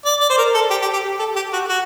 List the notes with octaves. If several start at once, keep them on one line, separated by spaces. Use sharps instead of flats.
D5
D5
C5
A#4
A4
G4
G4
G4
A4
G4
F#4
F#4